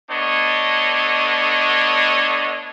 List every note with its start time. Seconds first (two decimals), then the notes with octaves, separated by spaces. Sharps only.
0.10 A3 B3 D4 C#5 D#5